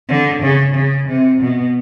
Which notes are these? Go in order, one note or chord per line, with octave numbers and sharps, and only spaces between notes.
D3
C#3
C#3
C3
B2